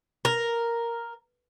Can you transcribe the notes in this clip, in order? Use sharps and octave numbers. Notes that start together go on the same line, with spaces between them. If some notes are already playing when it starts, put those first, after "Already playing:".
A#4